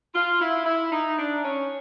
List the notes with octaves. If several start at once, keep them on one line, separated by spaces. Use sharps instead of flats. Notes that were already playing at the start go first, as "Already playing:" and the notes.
F4
E4
E4
D#4
D4
C#4